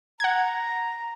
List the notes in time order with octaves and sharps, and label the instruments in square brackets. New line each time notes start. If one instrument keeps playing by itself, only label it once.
[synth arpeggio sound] F#5 G#6 [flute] A#5